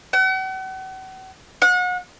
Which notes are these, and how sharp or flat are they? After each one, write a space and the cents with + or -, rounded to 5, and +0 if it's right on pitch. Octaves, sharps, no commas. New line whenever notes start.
F#5 +40
F#5 -35